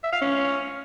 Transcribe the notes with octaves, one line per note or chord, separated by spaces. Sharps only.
E5
F5
C#4